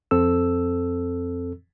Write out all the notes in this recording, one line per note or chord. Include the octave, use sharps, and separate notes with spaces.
F2 C4 A4 E6